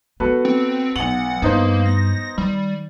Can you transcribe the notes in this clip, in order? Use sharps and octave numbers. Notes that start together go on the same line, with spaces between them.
B3 F#4 A4 B4
C4
B1 F#3 F#5 F#7
G2 A#3 B3 D#4 C5
A#6
D#3 G3